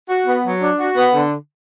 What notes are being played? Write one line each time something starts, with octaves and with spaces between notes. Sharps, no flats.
F#4
B3
F#3
D4
F#4
B3
D3